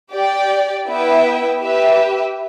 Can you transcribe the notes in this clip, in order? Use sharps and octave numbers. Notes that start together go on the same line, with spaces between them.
G4 D5 G5
B3 E4 B4 E5 G5
G4 B4 E5